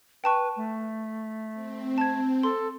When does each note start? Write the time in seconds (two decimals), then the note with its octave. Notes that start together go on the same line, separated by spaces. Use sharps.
0.24 B4 G5 A5 C#6
0.57 A3
1.53 C4
1.98 A5 G#6
2.43 A4 C6